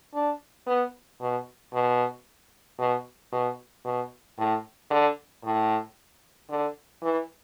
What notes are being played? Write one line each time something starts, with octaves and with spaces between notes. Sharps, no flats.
D4
B3
B2
B2
B2
B2
B2
A2
D3
A2
D3
E3